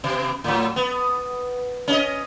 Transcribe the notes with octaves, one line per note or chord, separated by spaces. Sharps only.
B2
A2 F#3
B3
C#4 D#4 D#5